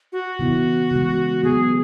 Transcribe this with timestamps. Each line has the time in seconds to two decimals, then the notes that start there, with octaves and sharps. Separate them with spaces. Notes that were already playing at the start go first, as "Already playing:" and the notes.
0.12 F#4
0.39 C#3 E3 B3 E4
0.92 C#3 E3 G#3
1.44 C#3 F#3 B3 G#4